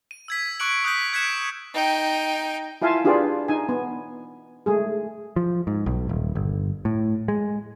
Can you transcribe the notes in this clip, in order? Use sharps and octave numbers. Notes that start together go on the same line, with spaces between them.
D#7
E6 G#6 B6
C#6 D6 F#6 C#7 D7 F#7
D#6 F#6 G6 B6
F#6 G#6 B6 C#7 D7 E7
D#4 G5
E4 F4 E5 F5 G#5 A5
D4 F4 G4 G#4 B4 D5
D#4 G#5
B3
G#3 A3 G#4
F3
G#2
B1
D#1
G1
A2
G#3